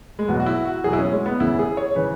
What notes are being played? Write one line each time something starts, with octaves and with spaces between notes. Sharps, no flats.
G#3
E2 B2 F#3 B3
F#4
E4
F#4
E2 B2 F#3 G#4
E4
C#4
G#3
B3
E2 C#3 E3 E4
G#4
C#5
C#3 E3 B4